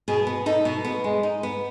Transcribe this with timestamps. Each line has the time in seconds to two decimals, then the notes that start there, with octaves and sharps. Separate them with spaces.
0.08 B2 G#4
0.27 B3
0.46 D#4 A4
0.65 B2
0.85 B3
1.04 G#3
1.23 D#4
1.43 B3